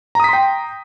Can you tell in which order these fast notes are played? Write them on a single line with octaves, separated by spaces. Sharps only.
A#5 D#6 B6 C6 G5